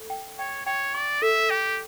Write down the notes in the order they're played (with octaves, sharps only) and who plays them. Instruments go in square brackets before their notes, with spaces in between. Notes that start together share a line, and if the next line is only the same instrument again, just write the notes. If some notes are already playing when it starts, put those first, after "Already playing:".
Already playing: [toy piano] A4
G5
[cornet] C#5 [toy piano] G5
[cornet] C#5 [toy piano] G5
[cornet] D5 [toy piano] C#6
[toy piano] A4 [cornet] E5
[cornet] G4 [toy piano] G5